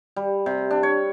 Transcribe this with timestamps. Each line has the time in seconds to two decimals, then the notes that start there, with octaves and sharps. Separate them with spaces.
0.16 G3
0.46 C3
0.71 D4
0.83 C#5